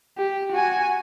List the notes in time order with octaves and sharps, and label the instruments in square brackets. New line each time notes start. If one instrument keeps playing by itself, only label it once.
[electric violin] G4
F#4 G#5